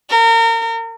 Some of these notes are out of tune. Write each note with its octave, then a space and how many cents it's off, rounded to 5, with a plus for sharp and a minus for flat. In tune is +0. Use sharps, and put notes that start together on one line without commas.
A#4 -30